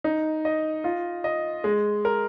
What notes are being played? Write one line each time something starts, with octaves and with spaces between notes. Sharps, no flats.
D#4
D#5
F4
D#5
G#3
A#4